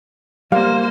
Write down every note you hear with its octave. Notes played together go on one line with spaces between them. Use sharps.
G3 A#3 C5 F5